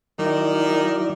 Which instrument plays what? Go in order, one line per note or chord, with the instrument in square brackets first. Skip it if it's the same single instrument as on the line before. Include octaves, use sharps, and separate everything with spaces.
[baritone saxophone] D#3 [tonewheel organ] F#3 E4 D5